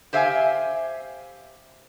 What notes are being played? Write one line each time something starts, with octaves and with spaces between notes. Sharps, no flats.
G4 C5 E5 F5 G5 G#5